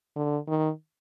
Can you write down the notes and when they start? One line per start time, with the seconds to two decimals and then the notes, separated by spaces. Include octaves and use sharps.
0.16 D3
0.47 D#3